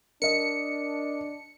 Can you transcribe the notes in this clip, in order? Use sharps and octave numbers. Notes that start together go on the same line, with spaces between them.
D4 A#4 D#5 C#7